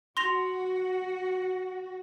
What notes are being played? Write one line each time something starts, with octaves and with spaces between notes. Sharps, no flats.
F#4 C6 A#6 F7